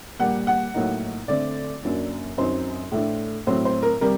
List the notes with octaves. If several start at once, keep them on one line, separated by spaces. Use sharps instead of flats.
A#2 G3 A#3 F#5
F#5
A2 F#3 A#3 D#4
D3 A3 C4 D5
F#2 F#3 A#3 D4
F#2 F#3 C4 D#4 C5
A2 A3 D4
A2 F#3 C4 C5
C5
A#4
C3 G3 A#4